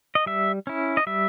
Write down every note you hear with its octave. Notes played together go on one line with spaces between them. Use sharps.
D#5
G3 E5
C#4 E4
D#5
G3 E5